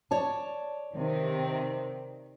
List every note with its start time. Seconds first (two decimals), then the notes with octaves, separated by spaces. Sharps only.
0.11 C#5 D5 A5
0.95 C3 D#3